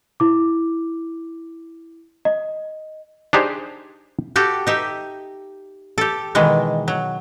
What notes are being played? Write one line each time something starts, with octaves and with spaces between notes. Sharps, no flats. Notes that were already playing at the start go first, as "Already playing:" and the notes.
E4 D6
D#5
D4 D#4 G4 G#4 C5
F#4 G4 A4
D#4 G4 E5
G4 A4
B2 D#3 E3 G#3
F#3